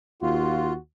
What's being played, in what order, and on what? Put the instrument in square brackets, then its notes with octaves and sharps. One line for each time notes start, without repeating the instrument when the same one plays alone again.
[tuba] D#2 [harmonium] F4 [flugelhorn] F#4